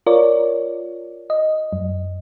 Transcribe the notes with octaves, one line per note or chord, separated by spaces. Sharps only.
F4 A#4 C#5 D5
D#5
F#2